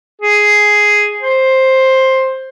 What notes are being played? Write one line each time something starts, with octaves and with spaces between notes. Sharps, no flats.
G#4
C5